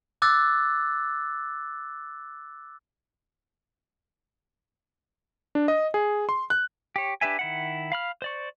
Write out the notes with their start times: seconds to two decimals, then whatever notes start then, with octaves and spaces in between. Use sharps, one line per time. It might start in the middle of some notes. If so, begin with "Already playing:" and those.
0.22 D6 E6 F#6 A6
5.55 D4
5.68 D#5
5.94 G#4
6.29 C6
6.50 F#6
6.96 G4 C#5
7.21 D4 G4 B4 E5 G#5
7.39 D#3 E4 F#5
7.92 F5 B5 F6
8.22 C5 D5 C#6